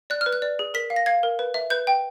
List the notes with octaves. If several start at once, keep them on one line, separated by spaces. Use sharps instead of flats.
D5 F#6
F6
B4
F#6
D5
G#4
A#4 B6
F5
A#6
F5 G#6
A#4
B4
E5
B4 G6
G5